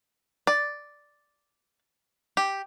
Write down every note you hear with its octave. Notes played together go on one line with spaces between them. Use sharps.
D5
G4